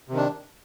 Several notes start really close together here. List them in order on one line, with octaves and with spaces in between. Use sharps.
C3 D#3 D4